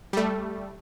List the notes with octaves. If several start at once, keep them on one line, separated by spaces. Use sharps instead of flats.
G3 A3